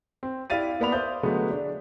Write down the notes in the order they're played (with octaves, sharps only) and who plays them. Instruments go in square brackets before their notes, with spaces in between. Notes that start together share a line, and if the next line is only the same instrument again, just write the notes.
[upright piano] C4
E4 G4 D5 F5 A6 D#7
A#3 B3 D5 B5 F7
C5 D5 E5 F5 D#6 G6
D3 F#3 G#3 A3 B3
D4